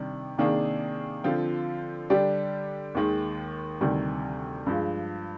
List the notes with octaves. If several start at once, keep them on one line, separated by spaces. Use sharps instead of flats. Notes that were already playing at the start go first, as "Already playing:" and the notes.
Already playing: C3 D#3 G3 D4
C3 D#3 A#3 D4 G#4
D3 F3 C4 F4
D3 G3 D4 G4
D#2 D#3 G#3
D2 C3 D#3 G3
G2 F3 G#3